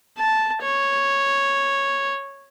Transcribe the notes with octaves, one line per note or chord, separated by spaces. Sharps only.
A5
C#5